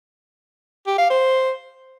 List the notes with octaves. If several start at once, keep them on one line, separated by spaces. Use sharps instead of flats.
G4
F5
C5